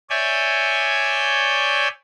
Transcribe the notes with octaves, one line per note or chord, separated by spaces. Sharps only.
C#5 D5 E5 G#5 G6